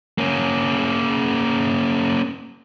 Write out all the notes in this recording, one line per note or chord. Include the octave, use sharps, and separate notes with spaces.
A#3 C#4